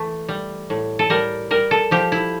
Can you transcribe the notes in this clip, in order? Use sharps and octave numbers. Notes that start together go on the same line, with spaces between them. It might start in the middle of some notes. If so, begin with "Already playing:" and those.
Already playing: E3 A3
G3
A2
A4
G3 A#4
G3 A#4
A4
F3 G4
E4